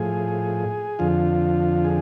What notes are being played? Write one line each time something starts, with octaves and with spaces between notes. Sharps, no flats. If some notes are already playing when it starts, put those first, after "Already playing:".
Already playing: A2 F3 G#4
F2 D3 F3 F4
G#4